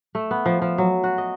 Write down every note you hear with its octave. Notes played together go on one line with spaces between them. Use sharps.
A3
B3
F3
F3
F#3
F#4
D#5